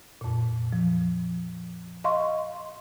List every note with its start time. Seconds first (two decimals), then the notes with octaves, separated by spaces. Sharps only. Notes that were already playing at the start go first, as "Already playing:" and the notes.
0.21 F2 A#2
0.73 F3
2.04 D#5 F5 C6 C#6